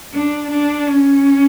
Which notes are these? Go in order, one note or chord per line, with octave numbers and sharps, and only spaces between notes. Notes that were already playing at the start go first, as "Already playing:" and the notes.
D4
D4
C#4